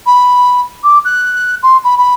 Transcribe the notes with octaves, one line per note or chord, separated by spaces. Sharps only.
B5
D6
F#6
C6
B5
B5